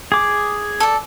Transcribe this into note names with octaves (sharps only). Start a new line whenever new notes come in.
G#4 D6
A4 D5